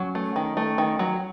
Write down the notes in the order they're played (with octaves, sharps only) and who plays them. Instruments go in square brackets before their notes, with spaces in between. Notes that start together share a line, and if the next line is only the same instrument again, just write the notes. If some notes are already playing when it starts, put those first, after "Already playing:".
Already playing: [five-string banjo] F#3 [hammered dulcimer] C#4
[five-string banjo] A3
D#3
A3
D#3
F#3